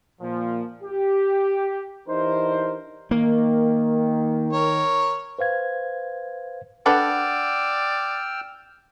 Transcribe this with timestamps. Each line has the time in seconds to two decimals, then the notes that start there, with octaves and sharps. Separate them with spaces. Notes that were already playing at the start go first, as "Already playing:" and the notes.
0.21 A#2 F3
0.82 G4
2.08 E3 D4 D#4 G4 A#4 C5
3.11 D#3 A#3
4.53 A#4 C#5
5.39 B4 C5 F5 G#6
6.86 D4 A4 B4 D5 F#5 G5 E6 F6